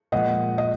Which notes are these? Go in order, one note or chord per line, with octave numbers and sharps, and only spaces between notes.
A#2 F3 G#3 D#5 F#5
D#5